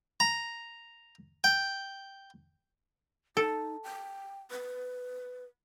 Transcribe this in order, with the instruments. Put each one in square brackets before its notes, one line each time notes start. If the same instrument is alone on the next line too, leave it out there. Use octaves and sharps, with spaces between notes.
[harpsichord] A#5
G5
[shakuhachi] D#4 [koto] A4
[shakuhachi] G5
B4